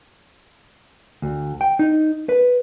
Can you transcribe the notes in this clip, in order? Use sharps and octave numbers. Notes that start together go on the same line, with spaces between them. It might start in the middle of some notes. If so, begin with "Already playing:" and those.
D2
G5
D#4
B4